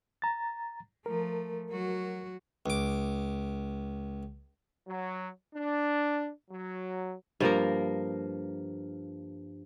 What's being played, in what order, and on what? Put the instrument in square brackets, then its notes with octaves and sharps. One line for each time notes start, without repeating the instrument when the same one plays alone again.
[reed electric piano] A#5 A6
[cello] F3 A3 [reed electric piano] A#4
[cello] F#3 F#4
[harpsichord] C#2 D6
[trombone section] F#3
D4
F#3
[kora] G2 F3 A#3 A#4